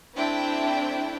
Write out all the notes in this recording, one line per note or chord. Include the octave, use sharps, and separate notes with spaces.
A3 C4 D4 E4 G5